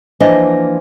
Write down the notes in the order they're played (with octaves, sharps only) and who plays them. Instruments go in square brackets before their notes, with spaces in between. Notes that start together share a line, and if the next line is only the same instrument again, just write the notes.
[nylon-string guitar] E3 F3 A#3 D4 D#5